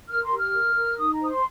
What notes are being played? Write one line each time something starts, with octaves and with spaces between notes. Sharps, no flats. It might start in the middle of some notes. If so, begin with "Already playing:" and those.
A#4 F6
C6
G4
F6
A#4
A#4
D#4 D#6
A#5
C5 D#6
C6